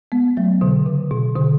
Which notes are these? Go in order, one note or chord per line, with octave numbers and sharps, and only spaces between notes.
G#3 B3
F#3 A3
B2 D3
C#3
B2
B2 D3